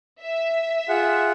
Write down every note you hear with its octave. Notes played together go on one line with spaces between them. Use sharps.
E5
F4 G#4 F#5